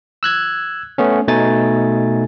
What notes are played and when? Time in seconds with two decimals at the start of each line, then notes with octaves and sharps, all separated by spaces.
0.23 E6 F#6 G#6
0.98 A3 B3 C#4
1.28 B2 A3 D#4 G#5 A6